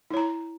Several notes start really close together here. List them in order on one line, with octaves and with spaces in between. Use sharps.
E4 C#5 A#5